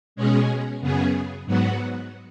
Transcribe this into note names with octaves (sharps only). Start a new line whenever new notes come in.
B2 G#3 C#4 G#4
F#2 C#3 B3 G#4
G#2 F#3 B3 F#4